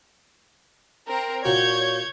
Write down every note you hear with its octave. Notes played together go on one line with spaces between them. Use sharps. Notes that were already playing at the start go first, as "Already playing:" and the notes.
C4 A#4
A#2 F#4 C#5 G6 G#6